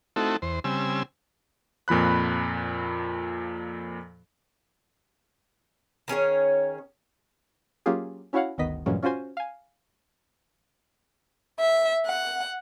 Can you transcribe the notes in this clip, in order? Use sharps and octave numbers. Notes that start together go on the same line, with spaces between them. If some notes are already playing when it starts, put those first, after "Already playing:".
A3 C4 D#4 E4 F#4 A4
E2 C5
C#3 G3 C4 G#5 E6
F2 A#2 F3 B5 F#6
D#3 C#4 G#4 C#5
F#3 A#3 C#4 F4 G4 G#4
C#4 E4 F#4 C#5 F5 F#5
G1 D2 D#3 B3 D#5 B6
G2 A#2 E3 F#3 G#3 C#4
C#4 F4 F#4 C5 G#5
F5 G#5
E5
F#5